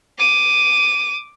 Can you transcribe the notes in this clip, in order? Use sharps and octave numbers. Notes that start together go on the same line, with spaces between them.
D6 D#7